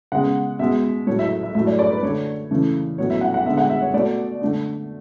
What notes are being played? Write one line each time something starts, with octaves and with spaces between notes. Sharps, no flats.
C#3 G#3 B3 F#5
B2 G#3 B3 E5
A2 F#3 A3 C#5
E5
E5
A2 F#3 A3 E5
D5
D5
B4
D3 A3 C#5
C#3 E3 A3
A2 F#3 B3 C#5
E5
F#5
F#5
D3 G#3 B3 E5
F#5
E5
C#5
B2 A3 D5
D3 A3